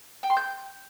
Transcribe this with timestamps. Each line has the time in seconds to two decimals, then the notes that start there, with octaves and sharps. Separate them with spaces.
0.23 G5
0.30 C6
0.37 G6